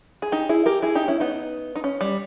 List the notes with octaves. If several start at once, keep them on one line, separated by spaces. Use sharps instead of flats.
G#4
D#4 G4
E4 G#4
G4 A#4
E4 G#4
D#4 G4
C#4 E4
B3 D#4
D#4
C#4
G3